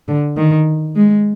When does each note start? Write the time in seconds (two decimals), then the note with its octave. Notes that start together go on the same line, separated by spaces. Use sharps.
0.08 D3
0.37 D#3
0.96 G#3